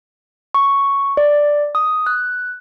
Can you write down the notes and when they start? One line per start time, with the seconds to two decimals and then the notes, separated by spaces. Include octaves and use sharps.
0.54 C#6
1.17 D5
1.75 D#6
2.06 F#6